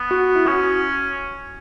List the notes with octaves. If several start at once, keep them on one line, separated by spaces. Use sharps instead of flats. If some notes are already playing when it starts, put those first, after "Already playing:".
Already playing: B3
F#4
E4
C#4 F#4